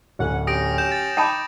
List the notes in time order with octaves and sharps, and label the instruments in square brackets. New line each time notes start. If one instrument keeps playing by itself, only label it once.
[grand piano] D1 [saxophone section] C#4 F#5
[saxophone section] C#4 G4 [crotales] D#6 A#6 D7
[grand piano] C#5 [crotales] G6 E7
[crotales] A6
[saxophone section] D#4 [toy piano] G5 A5 B5 [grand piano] D6 D#6